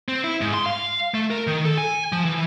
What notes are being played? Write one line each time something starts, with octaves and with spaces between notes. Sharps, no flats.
C4
E4
G#2
C6
F5
A3
A#4
D#3
A4
G#5
F3
E3